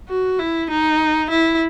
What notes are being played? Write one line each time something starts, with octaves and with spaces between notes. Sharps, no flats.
F#4
E4
D#4
E4